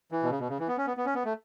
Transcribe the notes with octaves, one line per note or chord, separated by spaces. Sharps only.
E3
B2
C#3
B2
C#3
E3
B3
C#4
B3
B3
C#4
B3
A3